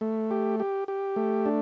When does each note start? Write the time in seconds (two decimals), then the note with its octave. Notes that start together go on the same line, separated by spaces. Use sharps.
0.01 A3
0.31 G4
0.60 G4
0.88 G4
1.16 A3
1.46 D4